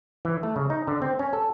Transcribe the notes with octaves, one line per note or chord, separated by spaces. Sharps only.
E3
A3
C#3
D#4
D3
C4
C#4
A4